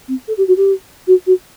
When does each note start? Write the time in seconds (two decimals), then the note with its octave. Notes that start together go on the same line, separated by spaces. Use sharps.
0.08 C4
0.28 A4
0.37 G4
0.48 F#4
0.57 G4
1.07 F#4
1.27 F#4